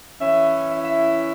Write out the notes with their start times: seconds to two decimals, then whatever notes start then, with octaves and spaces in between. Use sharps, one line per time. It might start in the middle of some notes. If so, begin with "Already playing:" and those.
0.20 E3 C#4 E4 E5
0.71 E5
0.84 E5